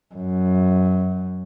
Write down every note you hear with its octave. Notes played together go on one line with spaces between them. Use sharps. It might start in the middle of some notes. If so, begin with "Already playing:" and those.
F#2